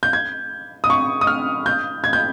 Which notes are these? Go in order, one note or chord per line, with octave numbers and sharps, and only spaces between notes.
G6
G#6
D#6
C#6
D#6
F6
G6
G#6
G6